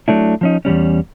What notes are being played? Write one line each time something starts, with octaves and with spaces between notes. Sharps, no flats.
F#3 A3 D4 E4
F3 C#4 D#4
E2 A#2 G3 C#4